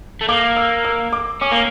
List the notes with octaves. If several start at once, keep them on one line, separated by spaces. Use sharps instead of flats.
A3
A#3 D6
E6
E6
D6
C#4 D6
A#3